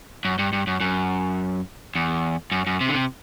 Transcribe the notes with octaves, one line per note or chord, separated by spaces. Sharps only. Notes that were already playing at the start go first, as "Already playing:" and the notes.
F#2
G2
G2
F#2
F#2
E2
F#2
F#2
C3
D3
C3